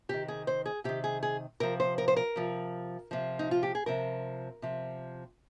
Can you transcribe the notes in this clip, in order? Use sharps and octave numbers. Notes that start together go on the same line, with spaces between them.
C3 D#3 G4
G#4
C5
G#4
C3 D#3 G4
G#4
G#4
C3 F3 A#4
C5
A#4
C5
A#4
C3 F3
C3 F3
D#4
F4
G4
G#4
C3 F3 A#4
C3 F3